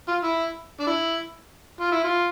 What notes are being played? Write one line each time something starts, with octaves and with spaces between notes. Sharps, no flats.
F4
E4
D4
E4
F4
E4
F4